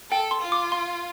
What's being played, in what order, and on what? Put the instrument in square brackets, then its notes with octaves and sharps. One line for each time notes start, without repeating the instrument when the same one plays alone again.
[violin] A4 [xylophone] G5
[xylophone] C6
[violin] F4
[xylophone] D6
C6